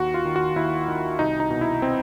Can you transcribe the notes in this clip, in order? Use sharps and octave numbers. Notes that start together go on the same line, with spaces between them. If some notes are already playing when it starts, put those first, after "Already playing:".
Already playing: D#2 F#4
F4
D#3
F#4
D#2 E4
D#3
C2 D#4
D#4
B2
E4
C4